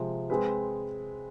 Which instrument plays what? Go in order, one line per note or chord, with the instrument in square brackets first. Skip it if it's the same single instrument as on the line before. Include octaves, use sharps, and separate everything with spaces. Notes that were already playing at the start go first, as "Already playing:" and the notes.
Already playing: [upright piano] C3 F3 G#3
G#3 C4 G#4 B4